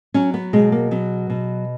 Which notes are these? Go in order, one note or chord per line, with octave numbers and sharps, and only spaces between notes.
F#3 C#4
B3
B2 G#3
A#3
F#3 B3
B2